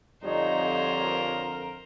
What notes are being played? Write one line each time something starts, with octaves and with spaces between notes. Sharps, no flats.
F2 D3 F3 G3 D#4 C5 C#5 A#5
A#4